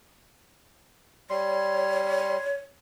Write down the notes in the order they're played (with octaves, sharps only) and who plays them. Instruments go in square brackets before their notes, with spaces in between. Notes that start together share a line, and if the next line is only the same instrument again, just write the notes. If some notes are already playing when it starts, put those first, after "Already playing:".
[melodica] G3 C6 [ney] C#5